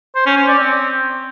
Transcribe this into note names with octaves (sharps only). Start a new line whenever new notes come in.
C5
C#4
C#4
D5
C4